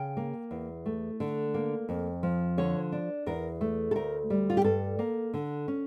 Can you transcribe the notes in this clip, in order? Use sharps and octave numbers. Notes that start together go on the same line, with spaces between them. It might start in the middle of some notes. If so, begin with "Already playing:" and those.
Already playing: C#3 G5
A#3
E2
A3
D3
A#3
F2
F3
D3 C#5
D4
E2 A#4
A3
A4
D2 A#4
G3
F4
G4
G2 A4
A#3
D3
C#4